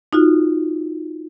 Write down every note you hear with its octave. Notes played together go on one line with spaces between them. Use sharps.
D#4 F4 F#4